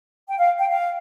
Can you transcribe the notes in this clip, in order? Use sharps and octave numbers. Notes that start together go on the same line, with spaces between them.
G5
F5
G5
F5